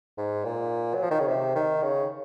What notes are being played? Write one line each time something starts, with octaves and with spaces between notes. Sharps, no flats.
G#2
A#2
F#3
F3
D#3
C#3
C3
D#3
C#3